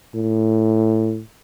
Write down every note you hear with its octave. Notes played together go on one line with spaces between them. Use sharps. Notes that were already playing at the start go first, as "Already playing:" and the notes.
A2